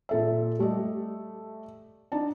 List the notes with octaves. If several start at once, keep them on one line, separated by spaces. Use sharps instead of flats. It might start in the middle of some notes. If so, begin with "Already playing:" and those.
A#2 A4 E5
G3 A3 D5 D#5
D4 D#4 D5 A5